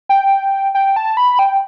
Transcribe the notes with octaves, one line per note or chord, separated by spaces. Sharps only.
G5
G5
A5
B5
G5